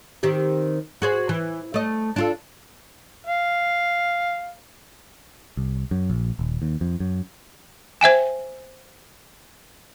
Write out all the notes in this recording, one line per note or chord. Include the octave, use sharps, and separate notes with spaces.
D#3 C4 G4
F#4 G#4 C5
E3
A3 D#5
D4 F4 A4
F5
C2
F#2
A#1
D#1
D#2
F2
F#2
C5 E5 G5 G#5